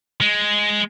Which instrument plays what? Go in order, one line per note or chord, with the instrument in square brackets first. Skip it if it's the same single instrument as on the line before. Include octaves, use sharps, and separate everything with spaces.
[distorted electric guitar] G#3